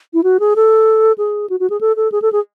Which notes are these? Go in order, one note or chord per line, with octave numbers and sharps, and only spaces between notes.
E4
F#4
G#4
A4
G#4
F#4
F#4
G#4
A4
A4
G#4
A4
G#4